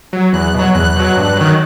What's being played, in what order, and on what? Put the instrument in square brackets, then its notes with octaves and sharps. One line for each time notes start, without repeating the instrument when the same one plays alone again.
[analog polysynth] F#3
E2 F#6
B2 F#3
E2 F#6
B2 F#3
G2
D#3 F#3